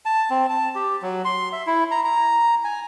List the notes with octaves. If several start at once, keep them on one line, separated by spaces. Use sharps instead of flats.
A5
C4
A5
G4
F#3
C6
E5
E4
A#5
A#5
G#5